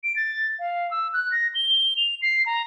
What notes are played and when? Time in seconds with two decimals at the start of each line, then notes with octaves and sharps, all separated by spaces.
0.04 D7
0.16 A6
0.59 F5
0.91 E6
1.13 F#6
1.32 A#6
1.55 G7
1.97 F7
2.22 C7
2.46 A#5